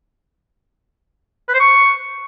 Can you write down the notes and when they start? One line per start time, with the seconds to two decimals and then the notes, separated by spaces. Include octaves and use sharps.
1.48 B4
1.54 C5
1.60 C#6